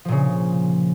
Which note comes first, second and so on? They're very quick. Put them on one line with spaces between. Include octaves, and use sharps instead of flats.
F3 A#2 C#3